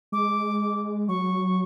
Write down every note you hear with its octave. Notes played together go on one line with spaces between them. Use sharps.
G#3 D6
F#3 C#6